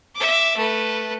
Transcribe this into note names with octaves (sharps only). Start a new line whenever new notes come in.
E5 D6
A3 B4